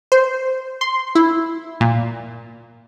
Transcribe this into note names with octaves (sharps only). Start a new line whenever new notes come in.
C5
C6
E4
A#2